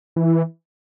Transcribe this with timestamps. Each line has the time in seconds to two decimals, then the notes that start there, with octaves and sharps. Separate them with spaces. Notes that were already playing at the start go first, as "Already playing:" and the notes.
0.16 E3